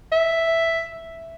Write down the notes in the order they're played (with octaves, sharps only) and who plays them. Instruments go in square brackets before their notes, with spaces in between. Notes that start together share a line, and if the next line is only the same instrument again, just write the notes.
[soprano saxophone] E5